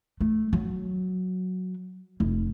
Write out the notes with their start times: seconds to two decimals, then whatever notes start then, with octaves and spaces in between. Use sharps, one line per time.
0.21 A3
0.53 F#3
2.20 F1